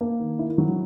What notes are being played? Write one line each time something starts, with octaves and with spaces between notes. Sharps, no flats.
A#3
D#3
E4
F#3